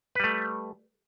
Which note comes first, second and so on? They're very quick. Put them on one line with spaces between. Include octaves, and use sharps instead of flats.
B4 G3 A3